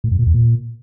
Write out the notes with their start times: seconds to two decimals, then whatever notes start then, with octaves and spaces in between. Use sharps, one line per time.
0.04 A2
0.11 F#2
0.19 A#2
0.26 E2
0.34 A#2